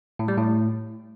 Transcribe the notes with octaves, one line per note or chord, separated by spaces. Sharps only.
A2
G3
A2